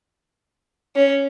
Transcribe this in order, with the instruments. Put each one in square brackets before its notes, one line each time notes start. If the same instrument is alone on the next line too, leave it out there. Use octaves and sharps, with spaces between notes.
[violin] C#4